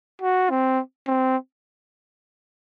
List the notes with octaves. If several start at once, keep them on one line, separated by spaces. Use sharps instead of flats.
F#4
C4
C4